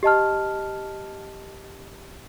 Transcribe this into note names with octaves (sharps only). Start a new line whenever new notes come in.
G4 D#5 A5 F6